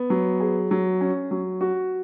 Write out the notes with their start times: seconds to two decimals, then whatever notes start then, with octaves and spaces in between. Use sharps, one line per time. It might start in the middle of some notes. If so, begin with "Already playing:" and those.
Already playing: B3
0.10 F#3
0.40 G#4
0.71 F#3
1.01 C#4
1.31 F#3
1.61 F#4